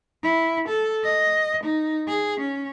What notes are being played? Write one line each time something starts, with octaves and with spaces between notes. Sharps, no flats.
E4
A4
D#5
D#4
G#4
C#4